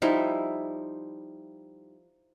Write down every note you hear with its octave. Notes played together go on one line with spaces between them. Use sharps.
F3 G3 D#4 E4